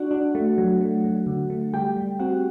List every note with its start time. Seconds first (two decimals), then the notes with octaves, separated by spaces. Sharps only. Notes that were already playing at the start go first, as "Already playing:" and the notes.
Already playing: D4 F#4 F#5
0.11 D4
0.35 A3
0.58 F#3
0.81 A3
1.04 F#3
1.27 D3
1.50 A3
1.74 G3 G4 G5
1.96 G3
2.19 C4 F#4 F#5